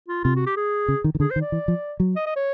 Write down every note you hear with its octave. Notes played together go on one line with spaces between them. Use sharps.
F4
C3 F4
F#4
G4
G#4
C#3
D#3
D#3
D3 G#4
C5
D#3
D5
E3
F3
F#3
D#5
D#5
C#5